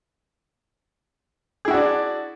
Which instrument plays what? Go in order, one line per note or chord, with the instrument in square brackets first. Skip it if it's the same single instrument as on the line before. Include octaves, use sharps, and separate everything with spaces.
[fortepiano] G#4
E4
F#4
D4
D5